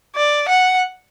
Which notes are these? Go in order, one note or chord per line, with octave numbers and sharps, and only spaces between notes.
D5
F#5